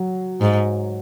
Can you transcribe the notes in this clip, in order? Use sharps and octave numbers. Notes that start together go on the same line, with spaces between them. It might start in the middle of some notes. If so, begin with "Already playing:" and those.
Already playing: F#3
G#2